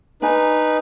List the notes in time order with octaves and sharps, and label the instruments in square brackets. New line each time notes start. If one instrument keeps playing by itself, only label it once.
[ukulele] D4 G#5 [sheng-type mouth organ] D#4 B4